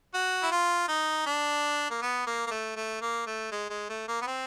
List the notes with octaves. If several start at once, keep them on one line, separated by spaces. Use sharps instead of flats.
F#4
E4
F4
D#4
D4
A#3
B3
A#3
A#3
A3
A3
A#3
A3
G#3
G#3
A3
A#3
B3
C4